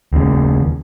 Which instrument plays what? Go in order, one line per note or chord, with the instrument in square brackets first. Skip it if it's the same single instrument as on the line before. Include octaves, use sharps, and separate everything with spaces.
[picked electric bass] D#2 C#3